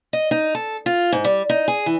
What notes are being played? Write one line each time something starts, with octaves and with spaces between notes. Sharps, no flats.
D#5
D#4
A4
F4
G#2
G3
D#4
G#4
E3